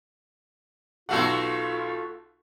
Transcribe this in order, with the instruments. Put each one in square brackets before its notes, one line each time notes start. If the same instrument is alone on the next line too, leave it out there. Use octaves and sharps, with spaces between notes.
[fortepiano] B1 F5 F#5 [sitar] A3 F#4 A4 [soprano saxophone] F4